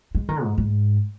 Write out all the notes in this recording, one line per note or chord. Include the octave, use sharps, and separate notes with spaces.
G#3
D#3
G#2
G#2